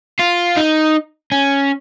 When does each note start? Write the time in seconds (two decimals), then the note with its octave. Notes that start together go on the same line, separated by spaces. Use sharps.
0.20 F4
0.57 D#4
1.32 C#4